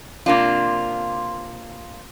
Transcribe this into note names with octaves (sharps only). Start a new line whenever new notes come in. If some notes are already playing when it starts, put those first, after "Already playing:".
C3 A#3 D4 F4